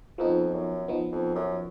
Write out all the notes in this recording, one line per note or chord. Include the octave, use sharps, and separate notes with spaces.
F2 F3 B3 D#4
F#2
F3 B3 D#4
F2
F#2